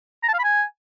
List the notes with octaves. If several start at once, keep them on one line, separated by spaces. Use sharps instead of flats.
A#5
A5
F5
B5
G#5